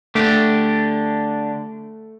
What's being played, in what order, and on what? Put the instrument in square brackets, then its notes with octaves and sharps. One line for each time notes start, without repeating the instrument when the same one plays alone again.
[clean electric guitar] D3 D4 G4 [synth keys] A3